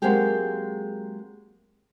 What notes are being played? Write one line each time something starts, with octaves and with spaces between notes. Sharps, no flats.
F#3 G#3 A#3 C4 G4 G#4